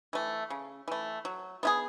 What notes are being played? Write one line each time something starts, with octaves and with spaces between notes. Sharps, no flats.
E3 A3
C#3
E3 A3
F#3
B3 E4 G#4